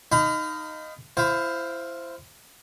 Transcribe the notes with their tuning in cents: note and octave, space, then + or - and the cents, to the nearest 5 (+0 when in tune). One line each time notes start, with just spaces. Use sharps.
D#4 +0 F5 +0 B5 +40
E4 +30 C5 +0 F5 +10